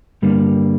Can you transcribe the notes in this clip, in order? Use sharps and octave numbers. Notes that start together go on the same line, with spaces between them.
G2 D3 G3 A#3